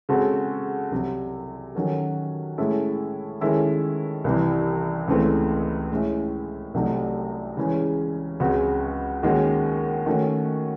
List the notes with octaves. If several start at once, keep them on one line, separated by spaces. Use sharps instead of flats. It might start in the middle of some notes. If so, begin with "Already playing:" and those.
C#3 G#3 C4 F#4 A4
C2 C3 F#3
D#3 F#3 C#4 F#4 A4
A2 G#3 C#4 E4 A4
D#3 G#3 C#4 E4 A4
C2 C3 E3
C#2 C#3 E3 A3 C4
A2 G#3 C#4 E4
C2 C3 F#3 A3 D#4
C#3 E3 G#3 C#4
C#2 C#3 G#3 C4 F#4
D#2 D#3 G#3 C#4 F#4
D#3 A3 C#4 F#4